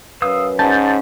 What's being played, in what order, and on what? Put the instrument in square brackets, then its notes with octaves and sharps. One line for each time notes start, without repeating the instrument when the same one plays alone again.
[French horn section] F#2 B4 [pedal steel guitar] F5 D#6 E6
[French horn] G#2 [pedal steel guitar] C#4 [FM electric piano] A5 G6 A6